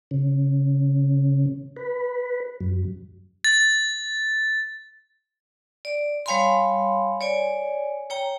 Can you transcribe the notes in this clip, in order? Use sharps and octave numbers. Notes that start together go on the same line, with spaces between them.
C#3
B4
F#2
A6
D5
G3 C#5 F5 G#5 B5 C6
C#5 D5 G#5
C#5 G5 A#5